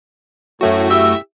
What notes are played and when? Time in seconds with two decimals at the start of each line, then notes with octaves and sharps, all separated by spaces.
0.61 F#2 A2 A3 F#4
0.89 E4 G4 E5